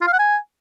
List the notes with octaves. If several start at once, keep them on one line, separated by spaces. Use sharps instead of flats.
F4
F5
F#5
G#5